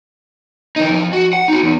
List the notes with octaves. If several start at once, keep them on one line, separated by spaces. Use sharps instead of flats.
E3 D#4
F2 F3
F#4
F#5
D#4 F#4
E2